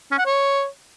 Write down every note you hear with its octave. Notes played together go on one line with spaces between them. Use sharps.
C#4
F#5
C#5